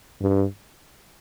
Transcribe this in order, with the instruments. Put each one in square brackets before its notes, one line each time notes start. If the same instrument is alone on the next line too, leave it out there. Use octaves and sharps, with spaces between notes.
[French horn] G2